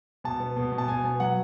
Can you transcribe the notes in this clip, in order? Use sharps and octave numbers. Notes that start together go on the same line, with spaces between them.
B2 A5
B3
B2
B2
A5
B2 G#5
B3
F#3 F#5